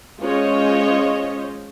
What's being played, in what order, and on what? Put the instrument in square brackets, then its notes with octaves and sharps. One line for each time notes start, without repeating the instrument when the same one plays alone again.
[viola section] G#3 C#4 F4 C5 C#5 D#5